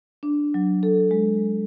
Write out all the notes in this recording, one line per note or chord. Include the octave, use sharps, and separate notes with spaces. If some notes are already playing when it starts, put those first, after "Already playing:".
D4
F#3
A4
G#3